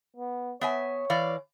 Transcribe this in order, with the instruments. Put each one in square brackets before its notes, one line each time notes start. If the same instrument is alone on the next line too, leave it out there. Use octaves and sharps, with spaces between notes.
[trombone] B3
[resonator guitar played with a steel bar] B3 E5 G#5 [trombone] C#5
[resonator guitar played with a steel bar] E3 D5 F5